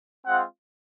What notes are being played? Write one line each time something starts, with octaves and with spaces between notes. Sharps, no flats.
G#3 C4 F4 F#5